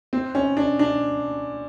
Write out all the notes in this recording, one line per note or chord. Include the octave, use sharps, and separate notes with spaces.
C4
C#4
D4
D4